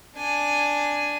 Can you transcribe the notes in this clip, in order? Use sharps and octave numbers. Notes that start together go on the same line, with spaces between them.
D4 G#5